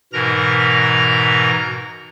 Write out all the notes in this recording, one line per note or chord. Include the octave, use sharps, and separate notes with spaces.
G#2 B2 E3 A#4 A#5 A#6